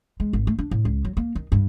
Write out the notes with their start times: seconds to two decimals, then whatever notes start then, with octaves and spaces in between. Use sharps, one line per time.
0.20 G#3
0.33 G#1
0.47 A3
0.59 D4
0.71 A2
0.85 C#2
1.05 F#3
1.17 A#3
1.35 D#3
1.52 G2